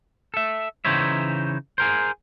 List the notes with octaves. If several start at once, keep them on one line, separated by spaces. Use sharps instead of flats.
A4 E5
C#3 E3 D#4 C5 C#5 E5
G#4 A#4 C5